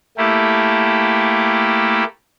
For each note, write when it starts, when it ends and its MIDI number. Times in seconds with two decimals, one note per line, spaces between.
0.18 2.04 57
0.18 2.04 58
0.18 2.04 64
0.18 2.04 67